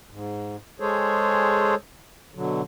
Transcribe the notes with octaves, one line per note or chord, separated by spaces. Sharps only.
G#2
G#3 G#4 A4 C5 C#5
B2 D3 F#3